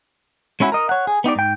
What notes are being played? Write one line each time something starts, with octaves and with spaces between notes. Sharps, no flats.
G#3 C#4 E4 F#4
A#4 D#5
C#5 F#5
G#4
B3 D#4 G4 D5
G#2 G5